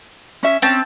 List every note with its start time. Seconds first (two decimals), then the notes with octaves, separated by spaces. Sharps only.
0.43 C#4 E5
0.62 C4 C#4 A5